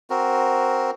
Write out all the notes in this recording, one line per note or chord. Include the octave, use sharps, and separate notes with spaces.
C4 F#4 A#4